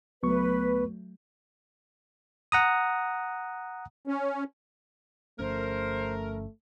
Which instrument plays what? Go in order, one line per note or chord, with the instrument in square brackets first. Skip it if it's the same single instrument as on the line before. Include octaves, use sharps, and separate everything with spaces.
[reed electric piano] C#2 B3 C#6 [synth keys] F#3 A3 [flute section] B4
[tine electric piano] F#5 A#5 D#6
[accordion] C#4
[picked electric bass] G1 F3 C#4 [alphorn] A3 [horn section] A#4 [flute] C5